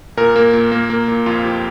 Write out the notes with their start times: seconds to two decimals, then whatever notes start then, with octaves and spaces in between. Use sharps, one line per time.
0.17 A#2 A#4
0.36 A#3
0.53 A#2
0.72 A#3
0.90 A#3
1.08 A#2
1.26 F2 F4
1.44 F3 G4